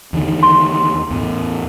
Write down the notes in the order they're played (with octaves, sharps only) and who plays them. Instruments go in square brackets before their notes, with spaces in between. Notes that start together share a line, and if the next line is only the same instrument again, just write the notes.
[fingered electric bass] E2 D3 D#3
[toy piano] C6
[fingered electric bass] E2 A2